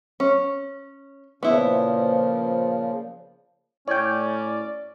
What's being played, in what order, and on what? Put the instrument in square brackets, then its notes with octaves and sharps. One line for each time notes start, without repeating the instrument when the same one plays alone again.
[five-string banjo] C#4
[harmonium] A#2 C#3 F3 [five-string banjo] B3 E4
[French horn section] A2 E4 [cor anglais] C#4 [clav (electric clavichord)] C#5 G5 [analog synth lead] D5